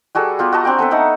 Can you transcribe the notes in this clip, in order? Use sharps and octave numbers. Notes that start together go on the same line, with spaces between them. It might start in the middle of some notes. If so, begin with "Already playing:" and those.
G3 F#4 G#4 A4
B3 F4 G4
F#4 D#5 A5 A#5
C4 D4 G5 G#5
B3 A4 B4 E5
A3 D#4 A4 F#5